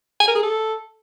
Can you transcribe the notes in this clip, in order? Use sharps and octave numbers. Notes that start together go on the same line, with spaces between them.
G#5
A#4
G#4
A4